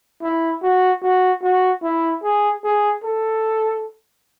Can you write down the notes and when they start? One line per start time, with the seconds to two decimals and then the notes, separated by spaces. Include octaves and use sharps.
0.22 E4
0.62 F#4
1.03 F#4
1.43 F#4
1.83 E4
2.23 G#4
2.64 G#4
3.04 A4